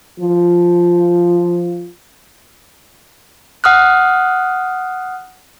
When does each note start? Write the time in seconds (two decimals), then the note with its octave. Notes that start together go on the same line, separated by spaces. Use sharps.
0.19 F3 F4
3.64 F#5 D#6 F6 F#6